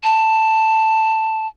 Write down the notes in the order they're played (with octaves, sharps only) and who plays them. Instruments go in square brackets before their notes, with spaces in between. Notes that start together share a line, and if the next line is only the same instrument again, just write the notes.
[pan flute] A5